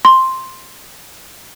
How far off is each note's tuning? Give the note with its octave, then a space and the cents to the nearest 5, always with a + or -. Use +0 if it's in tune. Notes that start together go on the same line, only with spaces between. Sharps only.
C6 +5